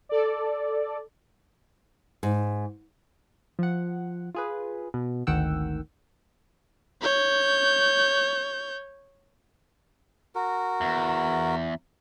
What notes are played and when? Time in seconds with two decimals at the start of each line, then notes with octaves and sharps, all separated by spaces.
0.09 A4 D5
2.23 G#2
3.59 F3 F#5
4.35 F4 G#4 B4
4.94 B2
5.27 G#1 D2 D#3 F#5 G5 E6
7.02 C#5 G6
10.35 F#4 A#4
10.81 E2